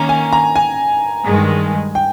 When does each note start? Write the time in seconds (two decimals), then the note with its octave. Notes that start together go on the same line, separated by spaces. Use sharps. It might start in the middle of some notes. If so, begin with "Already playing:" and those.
Already playing: D#3 A#3 C#4 A#5
0.09 G#5
0.32 A#5
0.56 G#5
1.25 G2 D#3 G#3
1.95 G5